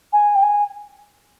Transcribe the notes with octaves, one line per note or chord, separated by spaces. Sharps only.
G#5
G5
G#5